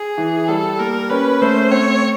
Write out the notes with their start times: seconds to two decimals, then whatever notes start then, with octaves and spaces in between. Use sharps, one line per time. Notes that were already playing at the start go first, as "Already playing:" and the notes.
Already playing: G#4
0.18 E3
0.48 G3 A4
0.79 A#3 A#4
1.10 C#4 B4
1.41 A3 C5
1.71 C4 C#5